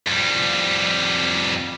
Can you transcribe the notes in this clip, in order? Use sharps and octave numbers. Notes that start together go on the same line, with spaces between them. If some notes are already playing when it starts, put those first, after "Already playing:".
F2 G3